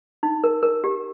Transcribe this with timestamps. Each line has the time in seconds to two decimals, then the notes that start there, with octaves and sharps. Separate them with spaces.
0.23 D#4
0.44 A#4
0.63 A#4
0.84 G4